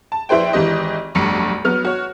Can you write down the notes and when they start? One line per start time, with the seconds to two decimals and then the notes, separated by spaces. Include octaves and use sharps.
0.12 A5
0.29 A#1 E4 B4 C5 G5
0.53 G#1 E3 G4 D#5
1.15 F1 B1 G2 C#7
1.64 F#3 B3 F6
1.85 F#4 C#5